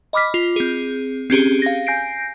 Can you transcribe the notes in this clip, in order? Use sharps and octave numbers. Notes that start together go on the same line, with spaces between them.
D#5 B5 D6 F6 B6
F4
C4 G#4
C4 C#4 G4 G#4
F5 A#6
G#5 G6 A#6 C7 D7